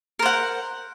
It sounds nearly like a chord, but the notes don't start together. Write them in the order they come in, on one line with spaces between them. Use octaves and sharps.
A#4 C5 F#5